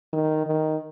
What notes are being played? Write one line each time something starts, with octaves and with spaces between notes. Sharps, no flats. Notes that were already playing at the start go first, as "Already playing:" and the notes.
D#3
D#3